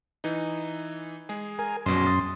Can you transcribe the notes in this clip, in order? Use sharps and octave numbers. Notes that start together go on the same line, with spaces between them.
E3 D#4
G#3 G#4
A#4 G#5
A#1 F#2 B2 C6
D#6 A6